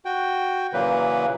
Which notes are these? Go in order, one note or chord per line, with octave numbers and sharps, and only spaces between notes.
F#4 G5
A#2 C#3 E3 F#3 A#3 B4